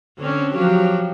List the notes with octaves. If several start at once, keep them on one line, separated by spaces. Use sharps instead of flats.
D3 C4 C#4
F3 F#3 G4